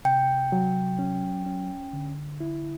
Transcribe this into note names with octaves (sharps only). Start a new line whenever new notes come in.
C3 G5
F#3
C#4
C#4
D3
E4